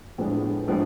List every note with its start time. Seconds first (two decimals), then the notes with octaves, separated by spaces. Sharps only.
0.18 A2 F3 G#3 B3 D4
0.67 A2 F3 G#3 B3 D4